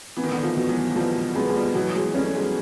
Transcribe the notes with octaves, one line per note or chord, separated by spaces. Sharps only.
E3 B3
D#3
D3 E3
D#3 F3
B2
E3 F#3
B2 F3 G3
F#3 G#3 B3
G#3
F3 G3
B2 E3 F#3
F#3 G#3
G3 A3 C#4
F#3 G#3